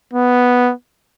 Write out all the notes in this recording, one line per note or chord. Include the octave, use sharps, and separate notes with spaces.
B3